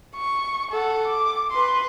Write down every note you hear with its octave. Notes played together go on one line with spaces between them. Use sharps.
C#6
A4 F#5
D6
B4 C6